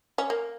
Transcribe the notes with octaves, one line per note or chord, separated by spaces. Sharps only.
C#4
A#3